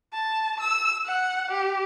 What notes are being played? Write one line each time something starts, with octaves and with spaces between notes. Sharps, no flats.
A5
E6
F#5
G4